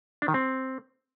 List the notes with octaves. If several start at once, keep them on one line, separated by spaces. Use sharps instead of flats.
D4
D#3
C4